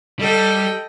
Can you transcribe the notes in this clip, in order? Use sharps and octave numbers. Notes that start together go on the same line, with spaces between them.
G3 A4 D#5 G5